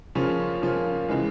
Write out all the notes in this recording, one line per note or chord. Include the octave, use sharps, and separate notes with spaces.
C#3 F3 A#3 C#4 F4
C#3 F3 A#3 C#4 F4
C#3 E3 G#3